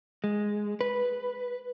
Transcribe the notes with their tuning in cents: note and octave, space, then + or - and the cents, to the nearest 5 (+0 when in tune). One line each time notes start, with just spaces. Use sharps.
G#3 +0
B4 +0